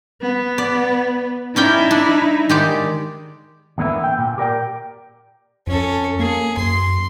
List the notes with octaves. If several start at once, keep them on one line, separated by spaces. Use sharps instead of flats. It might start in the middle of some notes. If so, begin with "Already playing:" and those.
B3
D5
C#4 D#4 E4 D5 G5
D4
D#3 G#3 G4 D5
E2 D3 A#3 B3 E5
G5
A#2
G4 A#4 D5 G5
F2 C#4 A4
A#3 G#4
F#2 C6